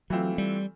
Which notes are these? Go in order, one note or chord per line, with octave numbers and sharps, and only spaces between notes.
E3 F#3 A3 C4 F4
G3